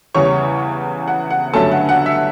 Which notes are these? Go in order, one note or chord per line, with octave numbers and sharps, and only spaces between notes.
E2 C#3 G3 C#5 C#6
F#5
F#5
G2 D3 F#3 A3 C#4 A4 A5
F#5
F#5
E5